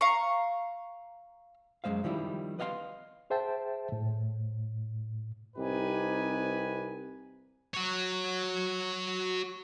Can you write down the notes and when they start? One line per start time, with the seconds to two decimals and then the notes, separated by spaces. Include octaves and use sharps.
0.01 F5 A#5 C#6
1.84 F#2 D#3 G#3 C5 F5
2.04 D#3 F3 G3 E4
2.59 B4 D#5 F5 G5 C6
3.30 G#4 C5 E5 G5 A5
3.92 A2
5.57 C2 C4 D#4 G4 B4 G#5
7.74 F#4 C#5